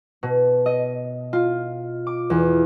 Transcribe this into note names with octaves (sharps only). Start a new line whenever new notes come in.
B2
D#5
F4
D6
E2